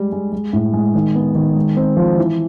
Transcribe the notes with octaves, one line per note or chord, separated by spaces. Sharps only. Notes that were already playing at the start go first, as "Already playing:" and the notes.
Already playing: G3 G#3 G4
G#3
G#3
A2
G#3
D#3
B3
D#3
G#3
C4
F3
E3